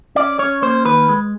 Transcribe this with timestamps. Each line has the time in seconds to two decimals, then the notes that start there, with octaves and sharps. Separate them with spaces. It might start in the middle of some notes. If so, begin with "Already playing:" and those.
0.15 C#4 D5
0.39 C#4 C#5
0.62 A#3 C5
0.85 D#3 B4
1.09 G#3